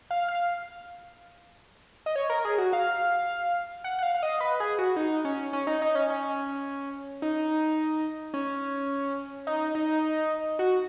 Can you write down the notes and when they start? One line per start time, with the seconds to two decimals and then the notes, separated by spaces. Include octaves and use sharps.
0.11 F5
0.28 F5
2.06 D#5
2.16 C#5
2.30 A#4
2.45 G#4
2.58 F#4
2.73 F5
3.84 F#5
3.99 F#5
4.03 F5
4.14 F5
4.23 D#5
4.41 B4
4.60 G#4
4.78 F#4
4.96 D#4
5.25 C#4
5.53 C#4
5.67 D#4
5.82 D#4
5.95 C#4
6.10 C#4
7.22 D#4
8.34 C#4
9.47 D#4
9.75 D#4
10.59 F#4